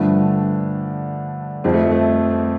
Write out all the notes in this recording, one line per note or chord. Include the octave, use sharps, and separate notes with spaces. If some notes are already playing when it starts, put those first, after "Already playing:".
Already playing: G2 D3 F3 A3
F2 F3 C4
A3
A3